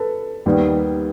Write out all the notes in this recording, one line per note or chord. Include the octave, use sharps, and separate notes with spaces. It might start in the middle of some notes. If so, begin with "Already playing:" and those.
Already playing: A4 B4
D#2 D#3 G3 B3